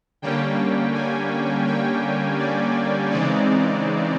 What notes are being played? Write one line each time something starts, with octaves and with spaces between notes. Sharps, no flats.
D3 G3 A#3 C#4 G5
G#5
G5
D5
C#3 E3 G#3 C4 D#4 D5